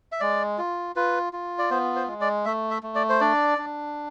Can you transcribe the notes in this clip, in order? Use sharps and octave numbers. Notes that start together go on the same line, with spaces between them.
E5
G#3 D5
F4
F4 B4
F4
D5
B3 C5
C5
G#3
D5
A3 E5
E5
A3
D5
C5
D4 D5
D4